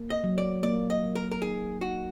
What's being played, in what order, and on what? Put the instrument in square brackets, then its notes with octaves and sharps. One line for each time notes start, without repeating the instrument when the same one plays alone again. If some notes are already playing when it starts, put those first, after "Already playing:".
Already playing: [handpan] A#3
[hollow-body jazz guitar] D#5
[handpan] F#3
[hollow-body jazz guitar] D5
[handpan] A#3 [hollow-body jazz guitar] D5
[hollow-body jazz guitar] D#5
[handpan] F#3
[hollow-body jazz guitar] A#4
A#4
[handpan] D#4 [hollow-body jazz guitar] G#4
[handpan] D#4 [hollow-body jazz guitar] F#4